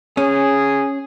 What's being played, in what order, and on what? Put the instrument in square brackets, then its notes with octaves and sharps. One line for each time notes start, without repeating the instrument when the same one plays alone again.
[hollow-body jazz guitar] C#4 [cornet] G#4